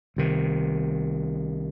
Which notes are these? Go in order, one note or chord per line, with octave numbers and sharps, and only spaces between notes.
C2 C3 D#3